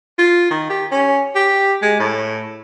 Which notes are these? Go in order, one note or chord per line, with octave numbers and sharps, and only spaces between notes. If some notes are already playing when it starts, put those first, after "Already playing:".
F4
D#3
G4
C#4
G4
G#3
A2